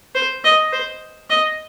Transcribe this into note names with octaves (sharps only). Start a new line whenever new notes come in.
C5
D#5
C5
D#5